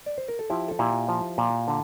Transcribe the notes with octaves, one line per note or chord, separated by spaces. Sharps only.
D5
C5
A#4
A4
F3 E4 G4
A4
A#2 E4 G4
F3
A#2
D3